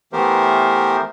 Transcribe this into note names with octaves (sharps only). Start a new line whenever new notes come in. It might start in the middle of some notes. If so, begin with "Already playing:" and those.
E3 A3 B3 G4 A#4 C5